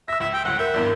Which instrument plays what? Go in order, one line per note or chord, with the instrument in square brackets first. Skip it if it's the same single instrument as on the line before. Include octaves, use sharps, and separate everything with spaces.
[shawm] E5 [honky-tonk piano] E6 A#6
[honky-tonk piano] C#2 [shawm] E5
[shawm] G5
[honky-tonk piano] G1 C#2 [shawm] F#5
[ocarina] A#4 [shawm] E5 [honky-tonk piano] G6
[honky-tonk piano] G#1 E2 G2